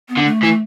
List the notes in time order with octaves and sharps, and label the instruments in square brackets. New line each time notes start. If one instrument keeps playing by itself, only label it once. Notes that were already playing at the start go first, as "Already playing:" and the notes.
[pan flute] B3
[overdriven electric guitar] D3
[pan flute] A3
[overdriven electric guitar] E3 [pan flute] A3